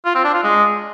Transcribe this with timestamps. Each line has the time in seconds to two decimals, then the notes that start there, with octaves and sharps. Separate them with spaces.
0.05 F4
0.15 C4
0.24 D4
0.34 F4
0.43 G#3